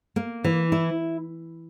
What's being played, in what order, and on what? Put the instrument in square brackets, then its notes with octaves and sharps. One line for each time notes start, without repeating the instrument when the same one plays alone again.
[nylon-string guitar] A#3
E3
E4